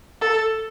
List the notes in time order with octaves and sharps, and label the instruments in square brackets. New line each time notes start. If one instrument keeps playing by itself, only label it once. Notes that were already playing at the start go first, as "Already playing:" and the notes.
[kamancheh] A4